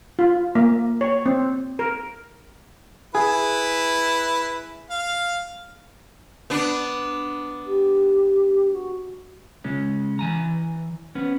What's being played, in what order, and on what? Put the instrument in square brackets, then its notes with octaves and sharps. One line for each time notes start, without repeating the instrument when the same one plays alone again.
[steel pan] F4
A#3
C#5
C4
A#4
[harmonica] E4 B4 [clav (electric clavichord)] G#4
[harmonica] F5
[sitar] B3 D4
[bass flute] G4
F#4
[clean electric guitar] C#3 G#3 C#4
E3 G#5 A#5
B3 C#4